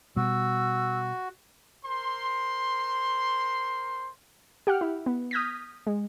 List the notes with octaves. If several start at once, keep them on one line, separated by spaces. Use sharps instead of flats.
B2 G3 F#4 E6
A#4 C5 C6
G4 F#5 G5 F6
E4
B3
D#6 F6 G6 G#6 A#6 B6
G#3